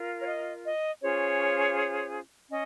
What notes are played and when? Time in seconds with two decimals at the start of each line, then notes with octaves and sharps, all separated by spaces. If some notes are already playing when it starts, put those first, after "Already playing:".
Already playing: F4 A#4
0.19 C#5
0.27 D#5
0.65 D#5
1.01 C#4 F4 G#4 C5 C#5
2.49 C#4 D#5